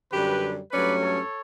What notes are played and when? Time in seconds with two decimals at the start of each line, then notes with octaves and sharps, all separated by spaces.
0.11 F#2 D3 G3 G4 B4
0.71 G2 F#3 A3 C#4 B4 D5
1.01 A4 C#5